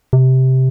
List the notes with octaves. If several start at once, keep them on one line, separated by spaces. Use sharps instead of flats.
C3